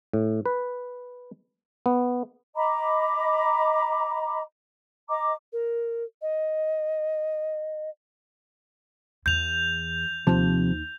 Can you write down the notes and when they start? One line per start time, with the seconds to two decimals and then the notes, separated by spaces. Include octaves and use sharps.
0.13 A2
0.46 B4
1.86 B3
2.55 D#5 A#5 B5 D6
5.09 D#5 A#5 D6
5.53 A#4
6.22 D#5
9.26 E2 G6 F7
10.27 D#2 C3 F3 D#4 A5